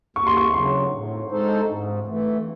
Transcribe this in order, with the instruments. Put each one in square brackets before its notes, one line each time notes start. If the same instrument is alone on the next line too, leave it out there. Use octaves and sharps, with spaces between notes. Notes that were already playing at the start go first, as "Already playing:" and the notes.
[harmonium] D#2 [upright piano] C#6
[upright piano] C6
C#6
[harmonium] C#3 F#3 [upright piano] C6
[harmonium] A2
G#3 D#4 A4 C5
G#2
E3 A3